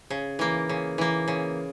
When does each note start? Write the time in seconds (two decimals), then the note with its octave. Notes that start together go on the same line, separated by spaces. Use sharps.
0.10 C#3
0.39 E3 A#3
0.69 C#3
0.98 E3 A#3
1.28 C#3